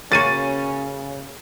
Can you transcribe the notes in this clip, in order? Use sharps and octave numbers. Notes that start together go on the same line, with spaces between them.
C#3 A#3 C#4 F#4 A6 D#7